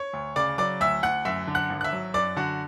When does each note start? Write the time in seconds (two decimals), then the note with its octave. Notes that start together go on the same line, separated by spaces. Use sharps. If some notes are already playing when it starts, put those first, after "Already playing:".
Already playing: C#5 C#6
0.13 D2
0.36 C#3 D5 D6
0.58 F#3 D5 D6
0.80 D2 E5 E6
1.03 D2 F#5 F#6
1.25 F#2 E5 E6
1.47 D3
1.55 F#5 F#6
1.70 G#1
1.81 F#6
1.84 E5 E6
1.93 F#3
2.14 F#2 D5 D6
2.36 D3 F#4 F#5